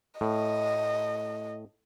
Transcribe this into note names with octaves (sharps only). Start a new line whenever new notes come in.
A2 D#5